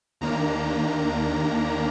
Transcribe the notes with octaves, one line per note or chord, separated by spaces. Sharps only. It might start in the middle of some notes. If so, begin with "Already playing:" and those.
D#2 D#3 A#3 D4 A#5